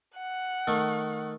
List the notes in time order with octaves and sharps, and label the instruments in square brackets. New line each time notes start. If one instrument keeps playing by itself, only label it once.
[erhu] F#5
[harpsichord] D#3 A3